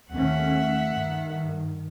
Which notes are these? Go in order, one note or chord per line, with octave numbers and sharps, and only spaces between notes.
D#2 A3 C#4 E5 F#5
G2 D#3